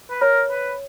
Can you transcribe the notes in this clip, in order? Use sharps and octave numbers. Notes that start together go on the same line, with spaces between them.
B4
A#4 C#5
B4